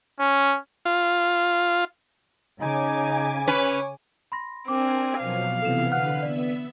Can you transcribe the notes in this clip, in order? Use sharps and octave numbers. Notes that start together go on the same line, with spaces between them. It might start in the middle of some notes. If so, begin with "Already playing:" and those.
C#4
F4
C#3 D#4 G#5 D6
C#4 B4 C#5
B5 C6 A#6
C4 D4 A#4 G#5 D6
B2 F3 F#3 F5
C3 E3 B3 A4 E7
D3 B4 F#5 F6 F#6
B3 D5 E5